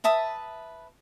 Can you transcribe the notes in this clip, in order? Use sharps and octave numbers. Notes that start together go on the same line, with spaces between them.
B4 E5 A5 D#6